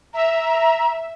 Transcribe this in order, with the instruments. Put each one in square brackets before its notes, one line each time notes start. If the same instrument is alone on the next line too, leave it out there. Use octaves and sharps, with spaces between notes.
[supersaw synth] E5 [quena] A#5